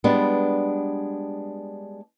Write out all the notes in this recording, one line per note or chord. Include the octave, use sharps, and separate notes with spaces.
G3 G#3 B3 D4